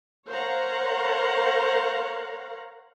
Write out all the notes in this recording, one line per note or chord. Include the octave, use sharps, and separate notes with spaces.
A#4 C5 C#5 F5 F#5 A#5